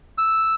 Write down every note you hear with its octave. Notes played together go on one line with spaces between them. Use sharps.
E6